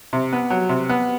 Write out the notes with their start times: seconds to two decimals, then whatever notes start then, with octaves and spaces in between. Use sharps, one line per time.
0.13 C3
0.33 B3
0.50 F#3
0.69 C3
0.89 B3